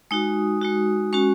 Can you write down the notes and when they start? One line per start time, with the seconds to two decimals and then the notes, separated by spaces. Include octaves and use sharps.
0.11 G#3 D#4 F#4 D#6
0.61 G#3 D#4 F#4
1.13 G#3 C#4 F#4 C#6